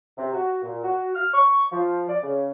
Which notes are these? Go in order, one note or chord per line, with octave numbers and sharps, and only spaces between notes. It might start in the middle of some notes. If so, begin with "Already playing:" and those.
C3
F#4
A#2
F#4
F6
C#6
F3
D5
C#3